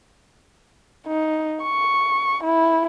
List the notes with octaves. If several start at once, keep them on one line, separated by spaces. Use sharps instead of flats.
D#4
C#6
E4